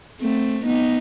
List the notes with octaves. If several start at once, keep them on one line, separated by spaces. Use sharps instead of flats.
A3 C4
B3 D#4